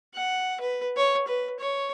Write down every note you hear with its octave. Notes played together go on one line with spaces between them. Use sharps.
F#5
B4
C#5
B4
C#5